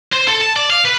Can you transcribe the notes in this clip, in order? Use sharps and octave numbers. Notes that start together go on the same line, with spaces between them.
C5
A4
A5
D5
F5
B4